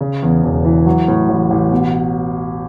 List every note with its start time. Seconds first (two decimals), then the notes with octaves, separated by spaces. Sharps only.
0.01 C#3
0.22 E2
0.43 E1
0.65 E3
0.86 F#3
1.08 A2
1.28 A1
1.50 A1
1.71 B2